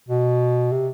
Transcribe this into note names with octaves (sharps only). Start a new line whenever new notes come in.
B2
C3